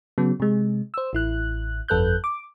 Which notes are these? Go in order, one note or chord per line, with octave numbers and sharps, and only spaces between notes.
C#3 F#3 B3
C3 G#3
C5 E6
A1 E4 F#6
G1 F2 A4 B4 F#6 G6
D6